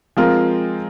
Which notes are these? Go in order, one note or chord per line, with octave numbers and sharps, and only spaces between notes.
F3 G#3 C4 F4 A#4